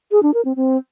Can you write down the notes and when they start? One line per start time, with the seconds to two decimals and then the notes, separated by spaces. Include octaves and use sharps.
0.12 G#4
0.23 D4
0.34 A#4
0.45 C4
0.56 C4